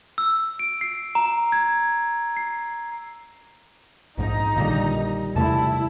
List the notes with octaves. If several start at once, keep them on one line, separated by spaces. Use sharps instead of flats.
E6
D7
C7
A#5
G#6
C7
A#1 G#2 D#4 A#5
A#1 A#2 D3 D#3 G3
E2 C3 A3 E4 A5